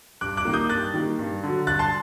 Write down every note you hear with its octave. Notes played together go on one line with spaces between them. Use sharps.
G2 D6 F#6
D6 F#6
D#3 G3 A#3
D#6 G6
G2 F#6 A6
D#3 G3 A#3
G2
D3 F#3
G2 F#6 A6
A5 C6